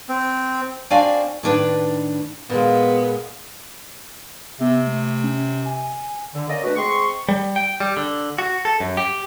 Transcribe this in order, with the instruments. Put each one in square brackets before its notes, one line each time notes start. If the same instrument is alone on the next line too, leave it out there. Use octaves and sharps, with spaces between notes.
[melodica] C4
[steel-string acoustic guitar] C4 D4 F#4 D5 F5 G#5
A2 D#3 D4 B4
[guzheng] A#2 G#3 [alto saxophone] B3
[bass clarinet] C3 [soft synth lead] B3
[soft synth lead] A3
C#4
G#5
[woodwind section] D3
A#3 C#4 D5 D#5
B2 D3 A3 D4 F#4 B4
G#3 C4 C6 C#6
[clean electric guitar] G3
G5
G3
D3
F#4
A4
F#2
G4